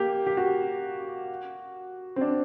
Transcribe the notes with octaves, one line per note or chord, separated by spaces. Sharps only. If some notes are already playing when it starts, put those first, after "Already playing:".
Already playing: A#3 G4
G4
F#4
C4
D4